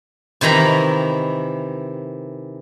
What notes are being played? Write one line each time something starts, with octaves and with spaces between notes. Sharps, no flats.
C3 D#3 E3 A#5 B5